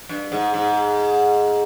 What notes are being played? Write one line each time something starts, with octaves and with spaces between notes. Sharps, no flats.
G2
G#2
G#2